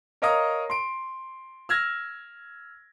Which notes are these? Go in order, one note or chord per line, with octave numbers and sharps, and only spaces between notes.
A#4 C#5 D#5 F5 A#5 D#6
C6 D7
E6 F6 G#6 A#6